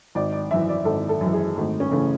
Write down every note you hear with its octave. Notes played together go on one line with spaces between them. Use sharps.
G#1 D5
D5
F#2 E3 E5
D5
G#1 A4
A4
F#2 E3
G#4
G#1 A3
C#4
C#3 E3 A3